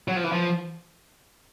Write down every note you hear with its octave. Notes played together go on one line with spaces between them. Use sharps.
F#3
F3
E3
F3